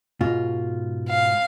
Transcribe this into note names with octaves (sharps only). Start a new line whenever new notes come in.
G#2 B2 F4
F5